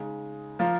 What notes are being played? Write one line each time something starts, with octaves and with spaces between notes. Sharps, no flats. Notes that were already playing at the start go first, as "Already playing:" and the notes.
Already playing: C#3 G#3 D#4
F3 A#3 F4